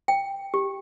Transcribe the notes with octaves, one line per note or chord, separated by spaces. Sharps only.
G5
G4